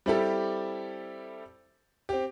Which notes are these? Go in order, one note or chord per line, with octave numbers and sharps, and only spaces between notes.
G3 C4 E4 G4 A4
C4 G4